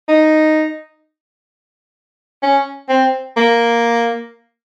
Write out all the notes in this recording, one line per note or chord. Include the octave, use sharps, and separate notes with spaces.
D#4
C#4
C4
A#3